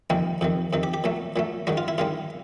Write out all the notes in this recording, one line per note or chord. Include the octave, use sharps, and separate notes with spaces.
F2 C3 D#3 G3 A#3
F2 C3 D#3
F2 C3 D#3
G4
G4
A#2 F#3 A3
A#2 F#3 A3
G#2 D#3 G3 F#4
F4
E4
G#2 D#3 G3 F4